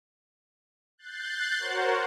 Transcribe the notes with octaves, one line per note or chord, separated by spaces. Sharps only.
F#6 G6 A6 C7
F#4 A#4 C5 C#5 F#5